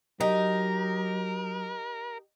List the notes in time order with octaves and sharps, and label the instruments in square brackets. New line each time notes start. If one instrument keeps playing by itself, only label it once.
[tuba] F#3 [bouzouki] D#4 [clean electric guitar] G4 [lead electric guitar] A#4